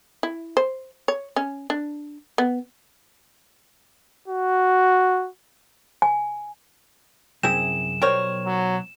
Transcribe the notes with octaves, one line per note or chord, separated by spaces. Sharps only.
E4
C5
C#5
C#4
D4
B3
F#4
G#5
C2 F#2 C4 E4 G#4 E7
B1 G3 A#4 C5 C#5 G5
F#3